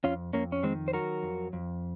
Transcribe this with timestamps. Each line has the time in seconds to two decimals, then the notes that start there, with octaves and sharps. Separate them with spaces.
0.04 F2 C#4 F4
0.33 F2 A#3 C#4
0.52 C#4
0.63 D#3 G#3 C4
0.88 C5
0.93 F#3 F#4 A#4
1.23 F2
1.53 F2